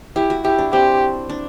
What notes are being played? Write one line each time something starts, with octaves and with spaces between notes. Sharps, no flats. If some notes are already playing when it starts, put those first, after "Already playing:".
E4 G4
F#4
E4 G4
D4
C4 G4
D4